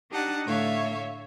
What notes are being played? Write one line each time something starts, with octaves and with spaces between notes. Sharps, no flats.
D4 D#4 G4 F#5 A5
A2 D3 A3 C#5 E5 F5